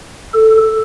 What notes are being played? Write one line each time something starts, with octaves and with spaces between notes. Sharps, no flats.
A4